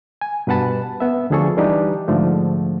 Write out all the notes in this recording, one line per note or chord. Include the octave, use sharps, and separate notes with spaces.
G#5
G2 B2 B4 F#5 A5 B5
B3 E5
D2 D3 F3 G#4 A4 C#6
E3 G3 D4 D#4 G4 B4
G#2 D3 F3 A3